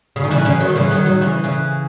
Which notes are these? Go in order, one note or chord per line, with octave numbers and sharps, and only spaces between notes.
C#3
D#3
C#3 E3
C#3 E3
D#3 F#3
C#3 E3
D#3 F#3
D#3 F#3
C#3 E3
C#3 E3